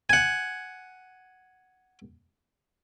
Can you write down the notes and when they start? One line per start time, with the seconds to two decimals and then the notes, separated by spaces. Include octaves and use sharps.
0.10 F#5 G#5